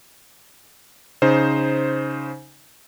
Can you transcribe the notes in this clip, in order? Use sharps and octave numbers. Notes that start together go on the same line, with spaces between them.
C#3 D#4 C5